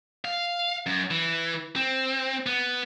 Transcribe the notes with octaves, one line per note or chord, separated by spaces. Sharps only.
F5
F#2
E3
C4
B3